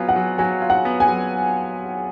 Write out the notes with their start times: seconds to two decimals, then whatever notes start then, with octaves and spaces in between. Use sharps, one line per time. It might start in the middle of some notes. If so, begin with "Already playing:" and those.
Already playing: F#3 B3 F4 G#5
0.09 F#5
0.16 F#3
0.38 F#3 G#5
0.62 F4
0.70 F#5
0.85 B3
1.00 G#5
1.09 F#3